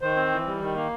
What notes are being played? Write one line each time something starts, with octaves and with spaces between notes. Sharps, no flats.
D#3 C5
C4
E3
G3
D#3
A#3